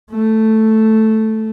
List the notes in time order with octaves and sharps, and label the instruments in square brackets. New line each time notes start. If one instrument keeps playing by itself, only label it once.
[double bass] A3